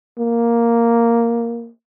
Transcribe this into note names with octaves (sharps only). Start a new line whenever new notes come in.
A#3